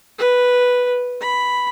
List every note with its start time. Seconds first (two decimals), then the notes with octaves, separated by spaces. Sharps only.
0.18 B4
1.21 B5